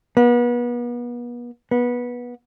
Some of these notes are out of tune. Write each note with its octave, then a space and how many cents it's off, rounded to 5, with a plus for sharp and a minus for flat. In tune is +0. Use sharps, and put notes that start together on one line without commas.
B3 -35
B3 -20